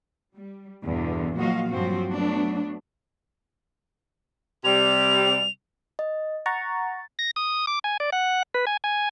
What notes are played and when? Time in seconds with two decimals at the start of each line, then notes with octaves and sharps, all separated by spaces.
0.34 G3
0.84 E2 G2 B2 D3
1.36 A#2 F3 F#3 F#4 D#5 F5
1.69 G2 F3 F#3 C4 F#4
2.12 F#3 A3 B3 D4
4.64 C3 G3 F7
5.99 D#5
6.46 F#5 A#5 C#6 A6
7.19 A#6
7.36 D#6
7.67 D6
7.84 G#5
8.00 D5
8.12 F#5
8.54 B4
8.67 G#5
8.84 G#5